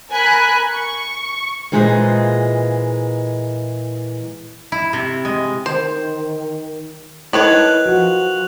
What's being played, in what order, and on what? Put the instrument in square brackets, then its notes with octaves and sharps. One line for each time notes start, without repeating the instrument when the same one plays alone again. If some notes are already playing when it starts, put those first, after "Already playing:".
[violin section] A#4 G#5 B5 F#6
C#6
[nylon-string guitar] A#2 E3 G#3 F4 C5 D#5
[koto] E4
C3
G#3
[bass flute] D#3 [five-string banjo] C5
[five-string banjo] D#3 B4 C#5 [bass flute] E4 [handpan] A4 [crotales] F#6 F7 F#7
[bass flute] F3 [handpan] F#4